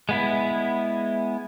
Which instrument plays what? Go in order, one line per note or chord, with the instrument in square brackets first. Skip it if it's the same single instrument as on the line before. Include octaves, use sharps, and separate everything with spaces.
[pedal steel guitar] G#3 B3 E4